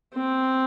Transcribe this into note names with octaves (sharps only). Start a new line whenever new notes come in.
C4